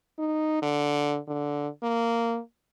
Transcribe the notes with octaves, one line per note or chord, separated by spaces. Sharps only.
D#4
D3
D3
A#3